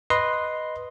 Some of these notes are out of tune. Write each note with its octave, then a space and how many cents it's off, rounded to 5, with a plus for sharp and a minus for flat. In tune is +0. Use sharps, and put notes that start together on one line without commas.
B4 +0 D#5 +0 C6 +0